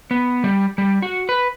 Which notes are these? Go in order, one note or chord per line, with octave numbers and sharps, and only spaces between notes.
B3
G3
G3
F#4
B4